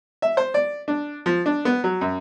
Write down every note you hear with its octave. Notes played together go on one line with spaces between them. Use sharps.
E5
C5
D5
D4
F3
D4
B3
F#3
F#2